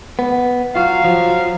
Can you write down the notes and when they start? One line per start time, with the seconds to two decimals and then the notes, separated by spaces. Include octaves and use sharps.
0.19 B3
0.76 F#3 F4 F#4 F5
1.04 F3